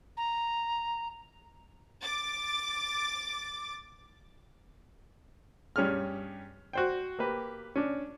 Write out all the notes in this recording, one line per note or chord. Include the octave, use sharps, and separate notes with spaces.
A#5
D6 A6
G2 C#4 G4 G#4 F6
F#4 C5 G5
A#3 G4 B4
C#4 D4